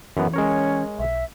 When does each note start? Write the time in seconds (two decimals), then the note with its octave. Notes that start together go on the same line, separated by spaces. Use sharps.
0.17 F#2 E3 B3
0.34 G#3 C#4 A#4 C#5
0.99 B1 E5